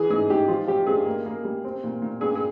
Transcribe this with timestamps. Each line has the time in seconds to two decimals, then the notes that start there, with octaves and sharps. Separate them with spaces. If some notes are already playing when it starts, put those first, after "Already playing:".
Already playing: E3 G#4
0.10 G#2 G#4
0.30 G#2 G4
0.48 F3 F4
0.67 F3 G4
0.87 G2 G#4
1.06 A#3
1.26 A#3
1.45 G3
1.65 C4
1.84 A#2
2.02 A#2
2.21 G2 G#4
2.35 G#4